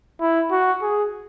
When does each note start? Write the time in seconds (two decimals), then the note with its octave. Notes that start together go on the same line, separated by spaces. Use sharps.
0.21 E4
0.51 F#4
0.82 G#4